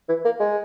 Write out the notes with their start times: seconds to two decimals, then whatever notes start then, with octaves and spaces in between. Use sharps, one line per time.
0.08 E3
0.25 A#3
0.39 G#3